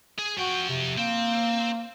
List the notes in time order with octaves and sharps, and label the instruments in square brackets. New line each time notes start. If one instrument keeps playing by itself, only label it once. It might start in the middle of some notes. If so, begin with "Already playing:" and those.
[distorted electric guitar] G#4
[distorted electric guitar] F3 G5 [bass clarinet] F#4
[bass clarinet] C3
[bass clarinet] A#3 [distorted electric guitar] C4